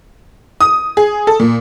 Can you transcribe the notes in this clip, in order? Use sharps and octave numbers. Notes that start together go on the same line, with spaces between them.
D#6
G#4
A4
A#2